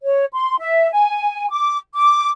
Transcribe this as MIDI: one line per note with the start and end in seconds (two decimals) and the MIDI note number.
0.04 0.25 73
0.33 0.56 84
0.59 0.91 76
0.92 1.47 80
1.51 1.78 86
1.94 2.31 86